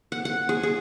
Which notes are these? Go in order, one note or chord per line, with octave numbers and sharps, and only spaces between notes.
F#5
F#5
G#4
G#4